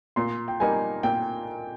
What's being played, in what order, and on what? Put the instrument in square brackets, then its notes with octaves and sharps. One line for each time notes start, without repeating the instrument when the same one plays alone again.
[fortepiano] A#2 [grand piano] C6
[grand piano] G5
[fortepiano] G3 A#3 D#4 [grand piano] G#5
[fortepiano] A#2 [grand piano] G5